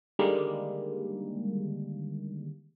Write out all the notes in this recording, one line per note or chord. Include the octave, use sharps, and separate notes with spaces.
D3 D#3 G3 G#3 A#3